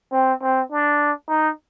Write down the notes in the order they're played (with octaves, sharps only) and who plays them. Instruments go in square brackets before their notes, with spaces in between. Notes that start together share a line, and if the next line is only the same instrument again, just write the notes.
[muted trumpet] C4
C4
D4
D#4